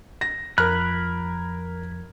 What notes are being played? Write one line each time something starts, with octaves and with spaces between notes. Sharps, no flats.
A#6
F2 F3 A#4 B5 F6 F#6 G#6